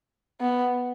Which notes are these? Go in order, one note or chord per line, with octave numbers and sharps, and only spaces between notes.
B3